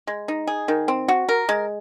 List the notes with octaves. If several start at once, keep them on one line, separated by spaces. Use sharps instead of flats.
G#3
D#4
G#4
D#3
C4
F#4
A#4
G#3